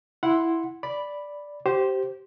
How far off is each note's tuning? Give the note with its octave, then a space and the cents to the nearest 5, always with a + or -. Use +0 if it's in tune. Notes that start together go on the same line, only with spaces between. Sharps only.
E4 +0 F#5 -10 C6 +0
D5 -5 B5 +0
G4 -20 C5 +0